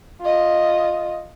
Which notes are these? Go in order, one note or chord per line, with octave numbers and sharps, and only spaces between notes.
F4 D#5